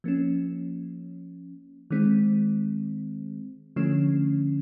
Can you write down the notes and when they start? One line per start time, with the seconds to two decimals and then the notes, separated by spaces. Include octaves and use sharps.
0.04 F3 A#3 C#4
1.90 D#3 G#3 C4
3.76 D3 F3 A3 C#4